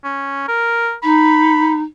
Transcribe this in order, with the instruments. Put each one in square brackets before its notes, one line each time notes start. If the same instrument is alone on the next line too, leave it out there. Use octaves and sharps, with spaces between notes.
[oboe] C#4
A#4
[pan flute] D#4 [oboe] B5